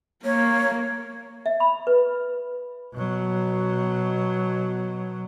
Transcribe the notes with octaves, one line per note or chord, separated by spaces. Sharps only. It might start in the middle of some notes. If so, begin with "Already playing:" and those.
A#3 C#5
E5
B5
B4
B2 F#3